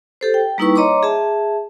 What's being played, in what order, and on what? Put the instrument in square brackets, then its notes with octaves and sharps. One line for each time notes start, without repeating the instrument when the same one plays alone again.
[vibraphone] G4 A4 C5
G5
G3 A#3 D#4 E4 B4 C#6
C#5 D#5 A#5 C6 D6
G#4 E5 A5